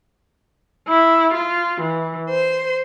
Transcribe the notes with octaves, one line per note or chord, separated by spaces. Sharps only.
E4
F4
E3
C5